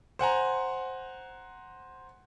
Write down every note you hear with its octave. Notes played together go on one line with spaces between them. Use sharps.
C5 F#5 G#5 A#5